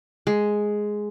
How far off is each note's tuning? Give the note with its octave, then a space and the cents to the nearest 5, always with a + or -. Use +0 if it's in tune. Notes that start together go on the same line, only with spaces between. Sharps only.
G#3 +5